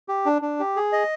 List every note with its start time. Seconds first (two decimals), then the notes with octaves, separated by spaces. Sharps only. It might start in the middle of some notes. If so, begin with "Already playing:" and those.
0.08 G4
0.25 D4
0.42 D4
0.59 G4
0.76 G#4
0.92 D#5